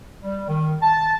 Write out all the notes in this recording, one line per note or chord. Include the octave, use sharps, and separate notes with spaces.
G3
D#3
A5